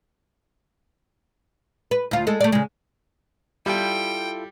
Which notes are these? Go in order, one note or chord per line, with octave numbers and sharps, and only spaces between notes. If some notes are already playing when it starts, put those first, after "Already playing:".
B4
D2 F4
G#3 A4
A3 D5
C#3 G#3
G3 E4 F4 A4 G5